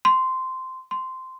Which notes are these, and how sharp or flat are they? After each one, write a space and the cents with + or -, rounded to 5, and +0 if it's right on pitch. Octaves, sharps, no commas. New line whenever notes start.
C6 -10
C6 -10